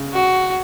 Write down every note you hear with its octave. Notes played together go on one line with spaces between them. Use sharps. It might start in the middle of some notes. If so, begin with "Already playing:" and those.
Already playing: C#3
F#4